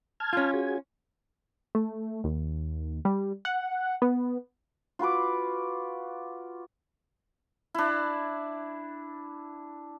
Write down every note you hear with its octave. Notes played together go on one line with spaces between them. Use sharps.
A5 F6 G#6
C#4 F4
F#4 G#4 G#6
A3
D#2
G3
F#5
B3
F4 F#4 B4 D6
D4 E4